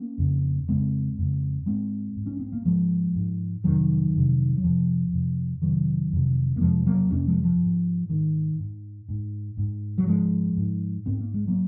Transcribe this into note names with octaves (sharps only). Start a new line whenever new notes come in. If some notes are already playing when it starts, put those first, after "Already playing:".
Already playing: A#3 C#4
F2 C#3
F2 C#3 G#3 C4
F2 C#3
G#2 G#3 C4
G#2
C#4
C4
A#3
G#2 F3 G#3
G#2
F2 C3 D#3 F#3
F2 C3
F#3
F2 C3 F3
F2 C3
F2 C3 D#3 F#3
F2 C3
A#3
F2 C3 F3 G#3
F#3 A#3
F2 C3 A#3 C#4
F3 G#3
F3
G#2
G#2 D#3
G#2
G#2
G#2
F#3
G#2 F3 G#3
G#2
G#2 C4
A#3
G#3
F#3 A#3